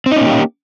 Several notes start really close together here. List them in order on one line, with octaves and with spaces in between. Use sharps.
C4 D#4 C#4 A#3 G4